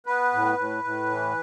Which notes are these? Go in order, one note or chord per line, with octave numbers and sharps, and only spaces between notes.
B3 B4
A2
A2
A2
E3